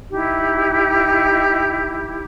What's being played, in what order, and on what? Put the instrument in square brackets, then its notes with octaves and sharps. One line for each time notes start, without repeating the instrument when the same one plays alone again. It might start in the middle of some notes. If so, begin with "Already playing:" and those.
[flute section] D#4 E4 G4